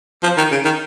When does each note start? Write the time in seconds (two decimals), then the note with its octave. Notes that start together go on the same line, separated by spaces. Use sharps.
0.23 F3
0.37 D#3
0.51 C#3
0.65 D#3